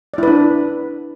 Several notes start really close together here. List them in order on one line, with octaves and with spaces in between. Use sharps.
D5 E4 B4 D4